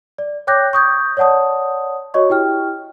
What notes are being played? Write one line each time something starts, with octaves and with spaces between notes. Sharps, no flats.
D5
C#5 G5 D6 F#6 G6 A#6
C#6 D#6 G6 G#6
C#5 D5 F#5 A5 D#6
F#4 C#5 D#5 C#6
E4 G4 G5 F6